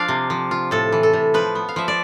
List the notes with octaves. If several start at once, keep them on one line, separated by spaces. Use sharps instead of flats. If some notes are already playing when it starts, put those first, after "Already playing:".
Already playing: F3 D4 D5 F5
C3
F3
F4
A2 A4
E3
A4
A2
F3 B4
B3
F5
F3 E5
D5